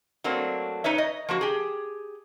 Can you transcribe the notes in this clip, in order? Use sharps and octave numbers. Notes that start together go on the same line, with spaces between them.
F#3 A3 A#3 C4 D4
D#4 B4 C#5 E5
D#5
F3 A#3 F#4
G4 G#4